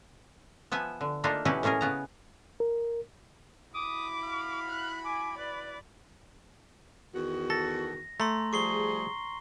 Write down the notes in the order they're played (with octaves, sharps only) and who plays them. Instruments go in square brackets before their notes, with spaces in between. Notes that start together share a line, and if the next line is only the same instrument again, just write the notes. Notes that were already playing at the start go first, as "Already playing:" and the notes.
[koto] F3 B3 E5 G#5
D3
A3 A#3 D4 D#4 F4
B2 E3 C#4 D#4 E4 G4
A2 A#3 C#4 G#4 A#4
C#3 B3 A#5
[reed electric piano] A#4
[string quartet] E4 F#4 B5 [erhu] D6 [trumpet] D#6
[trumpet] F5
[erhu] F#6
[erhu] G#5 [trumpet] D6
[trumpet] B4 [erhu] D5
[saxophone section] E2 D#3 F#4
[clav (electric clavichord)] A4 [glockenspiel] A#6
[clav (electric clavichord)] A3 [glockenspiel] A#5 C6
[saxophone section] F3 G3 G#4 [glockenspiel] C#6 C7 G7